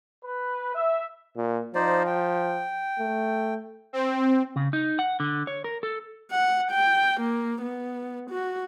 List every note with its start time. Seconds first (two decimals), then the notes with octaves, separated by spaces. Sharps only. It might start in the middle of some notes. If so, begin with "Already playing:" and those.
0.25 B4
0.74 E5
1.37 A#2
1.75 F3 D#4 C5 D5
2.06 G5
2.99 A3
3.93 C4
4.56 C#3
4.73 D#4
4.99 F#5
5.20 D3
5.47 C#5
5.64 A#4
5.83 A4
6.32 F#5
6.72 G5
7.21 A#3
7.62 B3
8.31 F#4